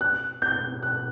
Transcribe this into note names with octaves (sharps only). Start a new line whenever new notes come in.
F#6
G6
F#6